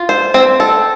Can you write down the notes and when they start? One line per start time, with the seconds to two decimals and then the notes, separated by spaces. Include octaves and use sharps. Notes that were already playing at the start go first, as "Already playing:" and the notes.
Already playing: F4
0.09 C5
0.34 C4
0.60 A4